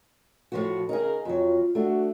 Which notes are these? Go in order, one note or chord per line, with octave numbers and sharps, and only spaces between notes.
A2 F3 F#4
C#3 D#4 G#4 A#4
F2 F#3 F4
A3 D4 F#4